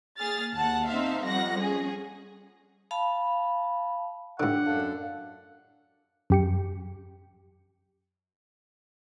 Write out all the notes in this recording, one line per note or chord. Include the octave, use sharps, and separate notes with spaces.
A#3 G#4 F6 A6
D#2 F#5 A5
C4 D#4 C5 E5 F5
F2 G3 C4 F#5 A#6
C#4 G#4
F5 A5 B5
A2 D3 D4 G4 F#5
F#2 D4 A4 F5
F#2 G4 C#7